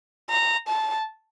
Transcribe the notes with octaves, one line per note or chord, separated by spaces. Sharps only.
A#5
A5